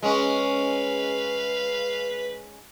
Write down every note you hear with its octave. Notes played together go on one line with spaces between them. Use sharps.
G#3 C#4 B4 F5